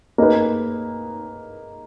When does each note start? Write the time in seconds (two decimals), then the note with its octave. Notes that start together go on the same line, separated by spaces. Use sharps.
0.18 A#3 D#4 G#4 B4